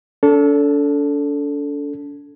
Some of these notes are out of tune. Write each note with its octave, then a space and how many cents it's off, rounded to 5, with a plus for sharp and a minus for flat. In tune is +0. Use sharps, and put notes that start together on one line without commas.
D4 -40 A4 +0